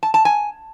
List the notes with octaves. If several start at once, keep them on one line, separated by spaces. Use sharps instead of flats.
A5
A5
G#5